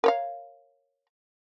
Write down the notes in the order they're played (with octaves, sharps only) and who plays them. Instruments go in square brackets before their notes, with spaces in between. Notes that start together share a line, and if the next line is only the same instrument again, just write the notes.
[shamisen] A#4 C#5 F5